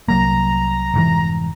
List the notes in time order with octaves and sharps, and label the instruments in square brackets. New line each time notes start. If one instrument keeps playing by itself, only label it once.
[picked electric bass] C2 F#3 A#3 [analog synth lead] A#5
[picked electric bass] F1 G#2 E3